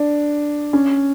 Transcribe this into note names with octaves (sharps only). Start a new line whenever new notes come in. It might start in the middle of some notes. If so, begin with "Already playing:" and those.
Already playing: D4
C#4